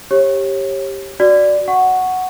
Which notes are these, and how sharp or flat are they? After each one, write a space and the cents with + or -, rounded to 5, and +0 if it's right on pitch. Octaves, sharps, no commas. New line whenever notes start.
G4 +0 C#5 -30
F#4 +0 D5 +0
F#5 +0 C#6 +0